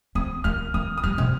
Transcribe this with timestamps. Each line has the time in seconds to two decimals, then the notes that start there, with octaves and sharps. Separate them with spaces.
0.15 C4 D#6
0.44 A#3 F6
0.74 A#3 D#6
0.98 D#6
1.04 G3 F6
1.18 C3